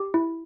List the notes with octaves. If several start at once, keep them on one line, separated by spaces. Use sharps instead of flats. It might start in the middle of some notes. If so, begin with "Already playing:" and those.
Already playing: G4
E4